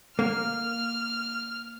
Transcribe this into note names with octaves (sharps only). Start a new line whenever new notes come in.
A#3 F6